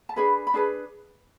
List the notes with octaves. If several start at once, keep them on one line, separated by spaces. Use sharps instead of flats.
A5
D4 G#4 B4 B5
B5
D4 G#4 B4 A5